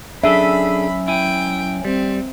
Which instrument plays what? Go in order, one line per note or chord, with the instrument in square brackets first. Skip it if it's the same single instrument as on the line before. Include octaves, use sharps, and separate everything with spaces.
[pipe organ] F#3 C#4 [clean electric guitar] D4 G#4 A4 [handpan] E5 [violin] B5
[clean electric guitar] E4 G#5 [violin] G5
[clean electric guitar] G3 [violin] C4